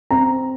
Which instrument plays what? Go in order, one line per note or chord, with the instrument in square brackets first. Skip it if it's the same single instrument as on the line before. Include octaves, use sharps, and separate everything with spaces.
[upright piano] C4 A#5